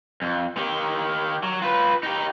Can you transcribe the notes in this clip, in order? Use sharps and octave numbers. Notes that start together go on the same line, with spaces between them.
F2
D#3 G4
F#3
F4 B4
D#4 G4